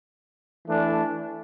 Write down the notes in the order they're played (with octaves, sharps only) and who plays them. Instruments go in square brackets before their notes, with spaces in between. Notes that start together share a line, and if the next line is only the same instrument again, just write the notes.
[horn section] E3 A3 D4